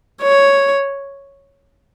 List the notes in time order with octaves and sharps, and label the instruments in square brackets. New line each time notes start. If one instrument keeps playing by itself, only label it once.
[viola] C#5